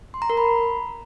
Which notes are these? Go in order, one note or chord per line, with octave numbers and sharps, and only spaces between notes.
C6
A#5
A#4
B5